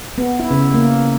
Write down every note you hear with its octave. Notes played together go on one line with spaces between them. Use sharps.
B3
E4
C#3
A#3